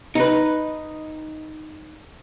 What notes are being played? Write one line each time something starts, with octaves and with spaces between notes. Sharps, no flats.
D#4 B4